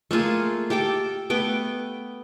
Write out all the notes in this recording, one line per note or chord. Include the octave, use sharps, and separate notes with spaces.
A3 A#3 F4 G#4
G4 A4 G5 D6
A3 B3 G5